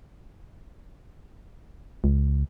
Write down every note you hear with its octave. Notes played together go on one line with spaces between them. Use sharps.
C#2